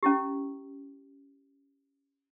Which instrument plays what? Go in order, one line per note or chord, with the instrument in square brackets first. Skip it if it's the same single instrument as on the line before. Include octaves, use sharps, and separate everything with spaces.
[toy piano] C#4 E4 G4